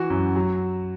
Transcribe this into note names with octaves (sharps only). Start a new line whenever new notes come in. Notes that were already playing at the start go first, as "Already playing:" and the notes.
Already playing: E3 F#4
F#2
F#3